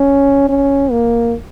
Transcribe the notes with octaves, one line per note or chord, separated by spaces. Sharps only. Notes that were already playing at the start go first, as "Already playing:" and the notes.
Already playing: C#4
C#4
A#3